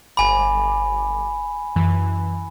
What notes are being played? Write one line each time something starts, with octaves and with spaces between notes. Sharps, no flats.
G1 G#5 B5 D6
F#2 E3